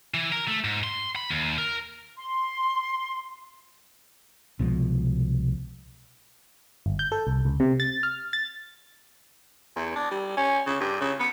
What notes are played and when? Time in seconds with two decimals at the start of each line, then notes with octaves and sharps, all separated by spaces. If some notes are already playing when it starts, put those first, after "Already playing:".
0.14 E3
0.32 A#4
0.48 A3
0.64 G#2
0.84 C6
1.16 B5
1.30 D#2
1.58 A#4
2.17 C6
4.59 C2 B2 F3 G#3
6.86 G1
6.99 G6
7.12 A4
7.27 C2
7.45 C#2
7.60 C3
7.80 A6
8.03 F6
8.33 A6
9.76 E2
9.96 D4
10.11 G3
10.37 C#4
10.66 C#3
10.81 G2
11.01 C#3
11.20 B3